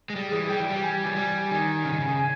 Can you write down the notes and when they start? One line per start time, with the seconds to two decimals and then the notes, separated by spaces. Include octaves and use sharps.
0.10 G#3
0.15 G3 G#4
0.32 E3 G#4
0.49 G3 G5
0.60 E3
0.70 G3
0.83 G#5
1.05 E3
1.17 G3
1.50 D#3 G#5
1.85 C#3
1.93 D#3
2.01 C#3
2.19 G#5